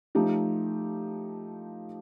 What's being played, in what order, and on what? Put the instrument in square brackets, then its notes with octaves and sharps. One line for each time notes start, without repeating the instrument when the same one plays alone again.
[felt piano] F3 A3 D#4 G4